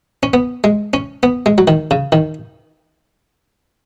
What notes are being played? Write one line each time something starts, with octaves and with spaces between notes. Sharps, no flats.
C#4
B3
G#3
C#4
B3
G#3
F#3
D#3
C#3
D#3